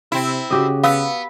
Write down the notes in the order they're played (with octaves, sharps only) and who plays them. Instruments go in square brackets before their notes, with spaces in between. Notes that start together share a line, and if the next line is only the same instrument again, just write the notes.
[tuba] C3 [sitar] C4 E4
[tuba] C#3 [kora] F#4 G4 D#5
[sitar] B3 [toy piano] F5 E6